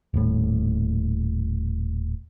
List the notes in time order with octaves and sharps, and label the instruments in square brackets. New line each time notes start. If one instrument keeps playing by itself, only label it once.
[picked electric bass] D#1 A2